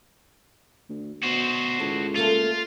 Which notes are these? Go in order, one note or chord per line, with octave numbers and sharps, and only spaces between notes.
D2
B2 F#4 C5
C#2 A2
A3 A#3 F4 A4